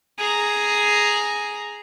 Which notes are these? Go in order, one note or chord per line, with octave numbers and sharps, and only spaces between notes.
G#4 A#5